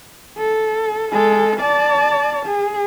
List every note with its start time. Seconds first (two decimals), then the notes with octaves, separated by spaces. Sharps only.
0.38 A4
1.12 G#3 A4
1.60 D5 A5
2.46 G#4